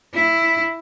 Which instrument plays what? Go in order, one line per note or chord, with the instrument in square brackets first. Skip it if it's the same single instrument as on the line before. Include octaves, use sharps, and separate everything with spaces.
[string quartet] E4